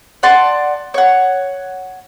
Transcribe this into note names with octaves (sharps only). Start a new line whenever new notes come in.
D5 F#5 A5 C6
C#5 F#5